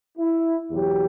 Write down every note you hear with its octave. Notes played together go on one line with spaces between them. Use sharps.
E4
E2 B2 F#3 G4